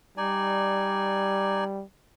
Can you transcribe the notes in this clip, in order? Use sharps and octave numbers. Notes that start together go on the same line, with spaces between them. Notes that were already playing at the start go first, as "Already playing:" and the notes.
G3 D#4 D5 G#5